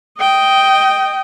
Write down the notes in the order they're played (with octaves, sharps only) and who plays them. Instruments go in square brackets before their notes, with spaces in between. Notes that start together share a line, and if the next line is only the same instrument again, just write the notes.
[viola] D#5 G5